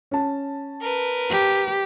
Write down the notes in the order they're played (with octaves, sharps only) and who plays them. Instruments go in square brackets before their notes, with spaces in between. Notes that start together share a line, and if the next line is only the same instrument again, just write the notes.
[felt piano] C#4 A5
[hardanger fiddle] A#4 B4
[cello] G4